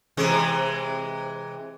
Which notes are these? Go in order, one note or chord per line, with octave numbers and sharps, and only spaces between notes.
C3 E3 G#3